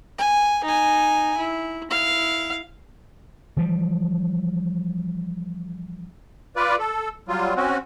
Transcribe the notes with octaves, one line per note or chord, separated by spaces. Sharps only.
G#5
D#4 G#5
E4
E4 F5
E3 F3 G3
F4 B4 D5
A4
F#3 G3 F4
C4 C#4 F#4